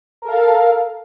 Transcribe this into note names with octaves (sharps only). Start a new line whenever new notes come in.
A4 A#4 F5